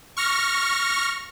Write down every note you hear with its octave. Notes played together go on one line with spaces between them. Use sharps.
C#6 F6 A#6